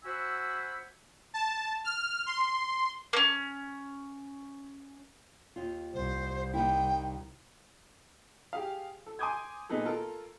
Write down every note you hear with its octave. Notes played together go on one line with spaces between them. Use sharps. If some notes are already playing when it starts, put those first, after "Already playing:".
F#4 C5 F#5 G#5 B5 E6
A5
F6
C6
A#3 C#4
D#2 F4
C2 C5
D#3 A#3 E4 G5
G4 G#4 F5
A4
G#5 C6 D6 D#6 G6 G#6
A#2 D#3 B3 D#4 G#4 A4
F4 A4 A#4